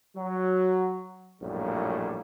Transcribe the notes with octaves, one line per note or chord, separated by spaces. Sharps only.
F#3
A#1 F#2 A2 G3 A#3